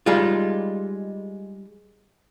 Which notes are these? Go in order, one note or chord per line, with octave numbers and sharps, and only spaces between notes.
G3 G#3 D#4 F4